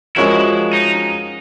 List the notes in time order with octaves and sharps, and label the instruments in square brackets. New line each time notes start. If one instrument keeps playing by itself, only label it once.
[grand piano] F3 G#3 C#4 F#4 A#4 [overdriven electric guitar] E4
[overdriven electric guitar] D#4